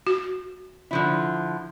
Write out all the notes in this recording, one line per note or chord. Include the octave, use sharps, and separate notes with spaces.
F#4
D3 F3 E4